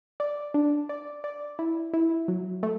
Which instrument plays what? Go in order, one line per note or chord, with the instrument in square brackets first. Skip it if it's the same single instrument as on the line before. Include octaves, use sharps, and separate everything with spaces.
[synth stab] D5
D4
D5
D5
E4
E4
F#3
A3